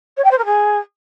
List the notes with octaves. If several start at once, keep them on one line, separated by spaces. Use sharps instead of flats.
C#5
G5
C5
A#4
G#4